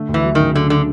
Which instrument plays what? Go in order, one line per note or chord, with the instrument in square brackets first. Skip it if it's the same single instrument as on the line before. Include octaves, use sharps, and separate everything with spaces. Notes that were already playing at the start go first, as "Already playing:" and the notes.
Already playing: [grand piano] D3 A3
D2
[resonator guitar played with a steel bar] E3
[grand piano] F#3
[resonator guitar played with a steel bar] D#3
[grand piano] C#3
[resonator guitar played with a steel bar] D3 [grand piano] A3
[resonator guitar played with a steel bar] D3